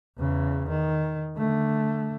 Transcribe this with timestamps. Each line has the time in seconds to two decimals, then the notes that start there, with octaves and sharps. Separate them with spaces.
0.18 E2 C#3
0.69 D#3
1.37 D3 A3